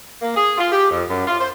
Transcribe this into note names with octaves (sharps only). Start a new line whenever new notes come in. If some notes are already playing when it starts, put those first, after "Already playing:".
A#3
G#4
F4
G4
F2
F#2
F4
C5